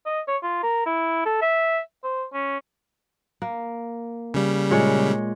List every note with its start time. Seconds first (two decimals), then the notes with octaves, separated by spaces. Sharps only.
0.06 D#5
0.28 C#5
0.43 F4
0.63 A#4
0.86 E4
1.25 A4
1.42 E5
2.03 C5
2.33 C#4
3.42 A#3
4.34 C#3 G3
4.70 A#2 G#3 C#5